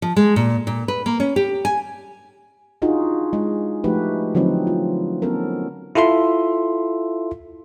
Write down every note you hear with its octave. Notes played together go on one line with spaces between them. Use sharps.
F3
G#3
A#2
A#2
B4
A#3
C#4
G4
G#5
D4 D#4 F4 F#4 G#4
G#3
F3 A3 D#4 F#4 G4 B4
D3 F3 F#3 C4 D#4
F4
B3 C#4 A4 A#4
E4 F4 A4 E5 C6